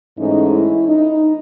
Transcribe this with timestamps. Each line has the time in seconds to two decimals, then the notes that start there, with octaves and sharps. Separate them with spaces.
0.18 G#2 E3 A3 C#4 D#4
0.52 E4
0.87 D#4